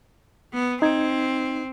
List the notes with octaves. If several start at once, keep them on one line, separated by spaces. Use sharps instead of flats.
B3
C4 D#4 G#6